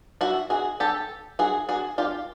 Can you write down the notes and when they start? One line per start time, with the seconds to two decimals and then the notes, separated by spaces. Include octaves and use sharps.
0.21 E4 F#4
0.50 F#4 G#4
0.80 G4 A4
1.39 F#4 G#4
1.69 F#4 G#4
1.98 F4 G4